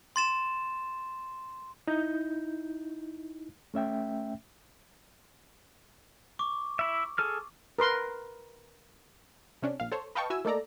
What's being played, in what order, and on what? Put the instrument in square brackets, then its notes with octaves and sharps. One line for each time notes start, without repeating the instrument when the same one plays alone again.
[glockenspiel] C6 A6 E7
[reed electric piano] D#4 E4 G6
A3 C#4 E5 G5
[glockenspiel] C#6 D6
[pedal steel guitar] E4 E5
G#4 A4 F6
[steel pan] A#4 B4 C6
[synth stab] C3 C#4 D4
A#1 F5
A4 C5 C#5
B4 D#5 F5 G5 A5 C#6
E4 F#4 E5 G#5 E6
A3 A#3 D#4 A4 D5 A#5